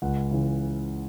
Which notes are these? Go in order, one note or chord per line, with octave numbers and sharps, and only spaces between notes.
C#2 F#5
C#3 E3